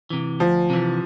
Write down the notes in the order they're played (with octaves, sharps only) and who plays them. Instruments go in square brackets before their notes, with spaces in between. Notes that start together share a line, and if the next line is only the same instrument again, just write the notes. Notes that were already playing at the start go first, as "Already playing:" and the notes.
[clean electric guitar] C3 E3
[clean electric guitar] D2 [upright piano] F3
[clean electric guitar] C3 E3